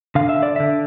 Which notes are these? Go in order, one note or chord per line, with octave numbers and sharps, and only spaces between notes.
D3 F5
E5
D5
D3 E5